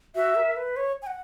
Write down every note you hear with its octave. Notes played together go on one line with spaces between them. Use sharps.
F#4 E5
A#4
B4
C#5
G#5
F#5